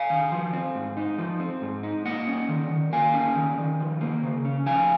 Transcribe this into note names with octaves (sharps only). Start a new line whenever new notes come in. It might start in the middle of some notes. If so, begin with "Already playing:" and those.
Already playing: F5 G#5
D#3
F3
C4
G#2
D#4
F3
C4
G#2
D#4
A#3 D#5 F#5
C#4
D#3
D#3
A#3 F5 G#5
C#4
D#3
D#3
F3
A#3
C#3
C#4
F3 F5 G#5